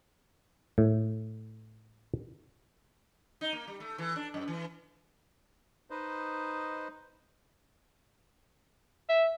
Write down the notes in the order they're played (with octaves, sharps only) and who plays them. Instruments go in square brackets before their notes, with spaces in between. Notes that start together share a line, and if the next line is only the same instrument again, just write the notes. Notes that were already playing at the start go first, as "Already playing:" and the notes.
[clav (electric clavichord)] A2
[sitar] D#4
A#3
G3
A3
E3
D4
F#2
E3
[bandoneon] D#4 B4 C5 D#5
[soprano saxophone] E5